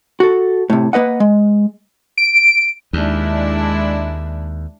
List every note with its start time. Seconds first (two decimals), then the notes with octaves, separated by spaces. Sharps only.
0.20 F#4 A4
0.70 A2 C3
0.93 A#3 B4 D#5 F#5
1.20 G#3
2.18 D7
2.93 D#2 G#3 D4 E4